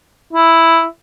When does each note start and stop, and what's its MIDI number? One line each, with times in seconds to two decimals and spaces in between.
0.33 0.85 64